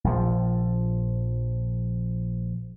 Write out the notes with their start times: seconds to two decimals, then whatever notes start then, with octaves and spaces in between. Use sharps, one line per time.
0.04 A#1 F3